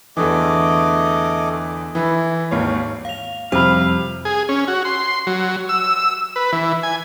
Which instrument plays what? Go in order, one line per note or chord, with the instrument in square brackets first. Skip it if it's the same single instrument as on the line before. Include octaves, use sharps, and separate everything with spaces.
[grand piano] E2 D3 E3 [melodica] A3 D#5 D6
[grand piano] E3 [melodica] E4
[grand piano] G#1 D#2 C#5 [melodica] F5
[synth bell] F5 F7
[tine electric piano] F2 F3 [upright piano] C3 B5 [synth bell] G3 C5 F7 [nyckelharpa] F5
[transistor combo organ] G#4
C#4
F#4
C6
F#3
E6
B4
E3
G#5